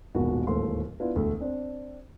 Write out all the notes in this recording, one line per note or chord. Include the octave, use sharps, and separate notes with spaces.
D#1 G#1 B2 B3 F#4
D1 D#2 G#2 A3 C5 C6
B3 D4 E4 F4 B4
E1 D2 A3
C4 D4 C5